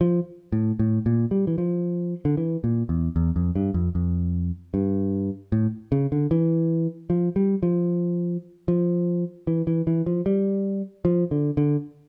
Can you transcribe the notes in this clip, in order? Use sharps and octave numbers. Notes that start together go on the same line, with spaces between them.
F3
A2
A2
A#2
G3
E3
F3
D3
E3
A#2
E2
E2
F2
G2
F2
F2
G2
A2
C#3
D3
E3
F3
G3
F3
F3
E3
E3
E3
F3
G3
F3
D3
D3